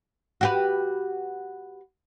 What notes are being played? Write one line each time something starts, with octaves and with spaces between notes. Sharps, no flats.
F#4 G4 B4